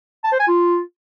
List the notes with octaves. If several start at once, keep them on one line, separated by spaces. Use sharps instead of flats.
A5
C5
G#5
F4